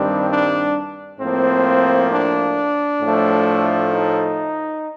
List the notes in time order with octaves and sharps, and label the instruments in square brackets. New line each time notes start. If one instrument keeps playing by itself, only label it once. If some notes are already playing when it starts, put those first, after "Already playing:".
Already playing: [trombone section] G2 D#3 G3 C4 D4
D4
A2 F3 A#3 C4
D4
A2 F3 A3
D#4